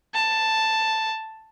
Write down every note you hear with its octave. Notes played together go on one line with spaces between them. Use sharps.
A5